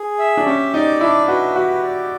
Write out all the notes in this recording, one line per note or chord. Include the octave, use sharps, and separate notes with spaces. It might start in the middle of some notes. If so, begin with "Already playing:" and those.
Already playing: G#4
E5
D4
C#4 G4
D#4 D5
D4 E4
F#4 B4
F#4 G4
D5